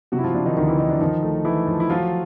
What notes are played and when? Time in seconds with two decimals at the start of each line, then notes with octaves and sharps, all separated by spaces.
0.12 C3 F#3 F#4
0.19 E4
0.24 F3 F4
0.34 C3 D4
0.46 D#3 D#4
0.57 D2 D#3 D#4
0.68 E3 E4
0.78 D#3 D#4
0.90 D4
1.00 D#3 F3 D#4
1.23 A3
1.45 E3 A3 E4
1.67 F3
1.80 E4
1.90 F3 F#3 F4